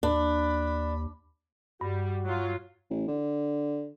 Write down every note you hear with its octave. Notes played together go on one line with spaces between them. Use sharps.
D#2 D4 B5
G2 G3 F#4
F#3 F4
A1
D3